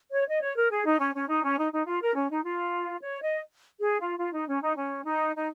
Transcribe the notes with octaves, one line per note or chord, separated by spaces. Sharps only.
C#5
D#5
C#5
A#4
G#4
D#4
C#4
C#4
D#4
C#4
D#4
D#4
F4
A#4
C#4
D#4
F4
C#5
D#5
G#4
F4
F4
D#4
C#4
D#4
C#4
D#4
D#4